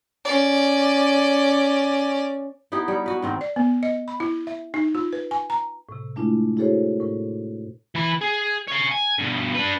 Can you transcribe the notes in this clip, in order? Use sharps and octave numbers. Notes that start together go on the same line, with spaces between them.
C#4 D5
B3 D#4 E4 G4
G3 C#5
F#4 B4
G#2 D#3 C4
D5
B3
D#5
B5
E4
E5
D#4
F4
B4
G#5
A#5
A2 C3
G#3 A3 D4 E4 F4
E4 F#4 G#4 A4 C5 C#5
A2 A#4
E3 B5
G#4
C#5 F5
G#5
G2 B2
D4 B4